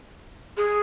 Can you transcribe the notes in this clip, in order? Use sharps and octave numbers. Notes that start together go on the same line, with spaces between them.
G#4